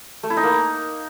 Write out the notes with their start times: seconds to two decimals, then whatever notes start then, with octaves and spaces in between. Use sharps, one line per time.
0.23 A3
0.30 E4
0.37 D#4
0.43 A#3